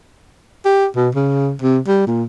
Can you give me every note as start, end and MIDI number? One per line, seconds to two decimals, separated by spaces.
0.65 0.86 67
0.96 1.09 47
1.15 1.55 49
1.62 1.79 48
1.87 2.03 55
2.07 2.23 46